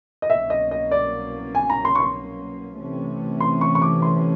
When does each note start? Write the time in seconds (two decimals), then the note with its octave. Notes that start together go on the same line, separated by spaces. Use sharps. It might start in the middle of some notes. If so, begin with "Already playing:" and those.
0.22 D#5
0.29 C2 B2 F#3 A#3 C#4 E5
0.50 D#5
0.71 D#5
0.91 D5
1.55 G#5
1.70 A#5
1.85 C6
1.95 C#6
2.00 C6
2.77 C3 E3 A3 C#4
3.40 C6
3.61 C#6
3.75 C#6
3.82 D6
4.02 C6